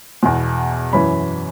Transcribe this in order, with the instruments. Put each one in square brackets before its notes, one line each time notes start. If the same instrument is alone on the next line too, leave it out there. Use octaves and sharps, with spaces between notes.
[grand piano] E2 B2
F#2 E3 B5